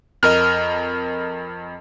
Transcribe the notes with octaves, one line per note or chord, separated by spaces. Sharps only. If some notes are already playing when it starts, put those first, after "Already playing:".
F2 A#4 D#5 F6